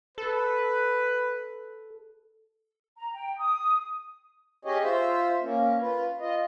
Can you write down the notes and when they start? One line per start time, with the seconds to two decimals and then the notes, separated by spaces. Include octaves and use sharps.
0.18 A4 B4
2.96 A#5
3.13 G5
3.39 D#6
4.65 C#4 G4 G#4 C#5 D#5
4.83 F4 C5 E5
5.42 A#3 C#4
5.81 F4 B4
6.21 F4 D#5